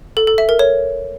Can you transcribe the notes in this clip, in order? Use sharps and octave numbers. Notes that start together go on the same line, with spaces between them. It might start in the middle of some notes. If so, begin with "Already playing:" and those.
A4
A4
E5
A#4
C#5